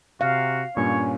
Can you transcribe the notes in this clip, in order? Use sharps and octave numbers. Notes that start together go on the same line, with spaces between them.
C3 F#4 F5
G2 A#2 C#4 C#5